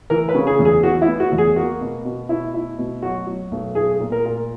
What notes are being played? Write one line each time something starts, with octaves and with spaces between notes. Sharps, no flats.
E3 A#4
B4
C#3
G#4
E2
G#4
E3 F#4
E4
B3
F#4
E2
G#4
A#3 F#4
B2
B2
B2 E4
E4
B2
F#3 F#4
F#3
B1
B1 G#4
A#2
A#4
A#2